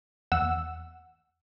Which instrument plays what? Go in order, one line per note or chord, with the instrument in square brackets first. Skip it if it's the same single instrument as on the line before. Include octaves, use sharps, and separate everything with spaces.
[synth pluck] E2 F#5 E6